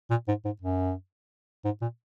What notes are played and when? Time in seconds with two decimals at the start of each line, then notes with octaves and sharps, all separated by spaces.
0.10 A#2
0.28 G#2
0.45 G#2
0.61 F#2
1.65 G#2
1.82 A#2